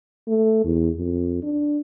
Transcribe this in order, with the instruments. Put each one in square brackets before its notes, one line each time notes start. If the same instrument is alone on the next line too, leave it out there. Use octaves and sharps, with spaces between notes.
[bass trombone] A3
E2
F2
D4